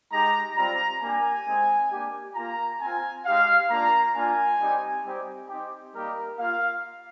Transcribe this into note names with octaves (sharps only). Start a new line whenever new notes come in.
G#3 D#4 G4 A#5
G3 C4 F4 A#5
A#3 D4 G4 G#5
G#3 C4 D#4
A#3 D4 G4
A#3 F4 A#5
C4 F4 G#5
G#3 D#4 G4 F5
A#3 D4 F4 A#5
A#3 D4 F4 G#5
G3 C4 D#4 G4
G3 C4 D#4 G4
C4 D#4 G4
G3 A#3 D#4 G4 A#4
A#3 F4 F5